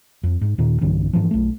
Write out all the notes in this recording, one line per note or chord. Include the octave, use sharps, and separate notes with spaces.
F2
G#2
D#2 A#2 D#3
B1 G2 D3 E3
G#2 E3 F3
B1 A3